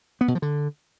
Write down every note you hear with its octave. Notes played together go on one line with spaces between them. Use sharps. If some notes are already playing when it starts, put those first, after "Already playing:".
B3
B2
F3
D3